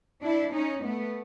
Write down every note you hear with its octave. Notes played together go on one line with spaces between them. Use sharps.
D4 E4
C#4 D#4
A3 B3